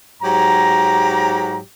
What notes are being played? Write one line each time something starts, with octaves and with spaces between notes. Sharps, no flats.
G#2 F#3 G4 A#5